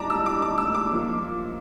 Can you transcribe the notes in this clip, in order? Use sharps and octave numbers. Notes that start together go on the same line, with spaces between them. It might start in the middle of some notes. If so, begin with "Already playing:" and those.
Already playing: A2 G3 D4 A5 A#5 D6
E6
D6
D6
E6
D6
A#2 F3 A#3